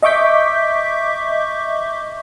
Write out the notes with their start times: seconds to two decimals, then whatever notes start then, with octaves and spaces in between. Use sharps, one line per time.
0.03 D#5 E5 C#6 D6 G6 B6